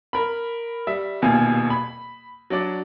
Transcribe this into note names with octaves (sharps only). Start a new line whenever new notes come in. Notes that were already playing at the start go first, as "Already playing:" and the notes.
A#4 B5
G3 E5
D#1 D#2 B2 F4 G#5
B5
F#3 D4 D5